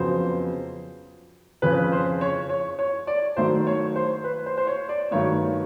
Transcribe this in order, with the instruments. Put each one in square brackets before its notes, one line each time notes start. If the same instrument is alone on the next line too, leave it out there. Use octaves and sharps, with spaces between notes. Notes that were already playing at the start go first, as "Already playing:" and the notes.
Already playing: [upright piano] F2 C#3 F#3 B3 [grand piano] C5
[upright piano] F2 C#3 F3 [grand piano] B4
[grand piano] C5
C#5
C#5
C#5
D5
[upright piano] D#3 F#3 A3 [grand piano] C5
[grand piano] C#5
C5
B4
C5
C5
C#5
D5
[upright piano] G2 D#3 F#3 A3 [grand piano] C#5